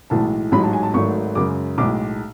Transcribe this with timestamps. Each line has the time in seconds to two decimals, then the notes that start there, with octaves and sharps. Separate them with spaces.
0.10 B1 A2 E3 G#3 A5
0.52 A1 G#2 F#3 B5
0.63 A5
0.73 G#5
0.83 A5
0.94 G#1 G#2 F#3 A3 C#6
1.35 F#2 C#3 G#3 D6
1.78 B1 A2 G#3 D6